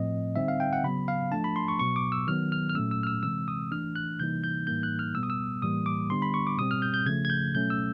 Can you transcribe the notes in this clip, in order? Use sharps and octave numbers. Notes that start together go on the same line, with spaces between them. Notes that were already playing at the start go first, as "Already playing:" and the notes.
Already playing: A2 F3 A3 C4 D#5
D3 G3 C4 D#4 E5
F5
G5
F#5
C#3 F#3 B3 B5
F5
F3 A3 D4 A5
B5
C6
C#6
B2 F#3 B3 C#6
D6
E6
D#3 F#3 B3 F6
F6
F6
A#2 F#3 A3 C#4 E6
E6
F6
E6
C3 E3 G#3 C4 E6
D#6
E3 A3 D4 F6
F#6
C3 E3 G3 A#3 D#4 G6
G6
A2 E3 G3 A#3 D#4 G6
F#6
F6
B2 G3 B3 E6
D#6
E6
A2 E3 G3 A#3 D#6
D6
D3 G3 B3 D4 C6
B5
C#6
D6
B2 G3 C4 D#6
F6
G6
G6
C#3 F3 A3 G#6
G#6
G6
B2 F#3 A3 C#4 G6
E6